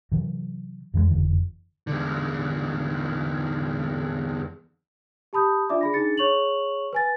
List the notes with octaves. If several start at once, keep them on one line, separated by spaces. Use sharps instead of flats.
C3 E3 F#3
F2 E3 G3 G#3
F#1 F2 D3 E3
E2 D3
G4 A5 B5 D#6 G6
D4 F4 D5 E5 D6
G#4 B5 A#6
D4 D#4 G#4 A6 C#7
G#4 C#5 C#6 F7 F#7
B4 G#5 A6